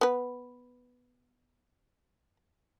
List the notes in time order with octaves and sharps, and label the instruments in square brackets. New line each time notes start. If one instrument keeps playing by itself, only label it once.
[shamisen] B3 B4